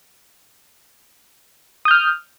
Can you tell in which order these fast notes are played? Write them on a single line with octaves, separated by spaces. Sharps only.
D#6 G6 F6